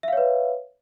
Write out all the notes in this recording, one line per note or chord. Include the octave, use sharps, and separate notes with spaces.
B4 C#5 E5 F5